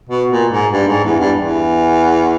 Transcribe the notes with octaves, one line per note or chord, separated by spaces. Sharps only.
B2
A#2
G#2
G2
G#2
E2
G2
E2